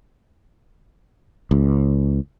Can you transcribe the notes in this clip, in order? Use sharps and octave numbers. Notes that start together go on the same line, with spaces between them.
C#2